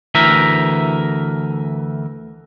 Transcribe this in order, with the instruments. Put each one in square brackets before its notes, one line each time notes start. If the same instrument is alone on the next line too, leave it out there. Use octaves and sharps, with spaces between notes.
[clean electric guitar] D2 E3 A#4 E5